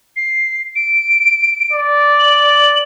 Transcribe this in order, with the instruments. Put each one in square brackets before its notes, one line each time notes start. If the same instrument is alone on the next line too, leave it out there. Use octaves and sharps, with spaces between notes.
[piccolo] C7
D7
[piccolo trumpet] D5
[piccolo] F#7